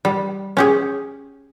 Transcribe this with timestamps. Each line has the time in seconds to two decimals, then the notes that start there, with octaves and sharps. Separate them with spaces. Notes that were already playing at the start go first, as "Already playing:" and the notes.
0.05 G3
0.57 C#4 G4 G#4